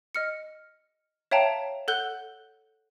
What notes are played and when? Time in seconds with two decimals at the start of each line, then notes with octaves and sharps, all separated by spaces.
0.15 D#5 F6 C#7
1.31 C#5 E5 F5 G5 A5 A#5
1.88 A4 F#5 F#6 G6 G7